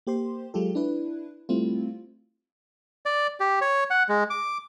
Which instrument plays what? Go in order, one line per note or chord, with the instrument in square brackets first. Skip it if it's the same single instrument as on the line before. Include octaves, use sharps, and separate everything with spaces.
[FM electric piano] A#3 G4 C5 C6
F#3 G#3 F4 G4 A4
D4 E4 B4
G3 A3 C4 E4 F4
[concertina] D5
G4
C#5
F#5
G#3
D6